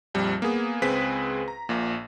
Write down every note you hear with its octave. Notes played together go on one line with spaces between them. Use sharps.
A#1 F2 G3
A#3 B3 G#4
C#2 C4 G#4 B4 B6
A#5
A#1 A#2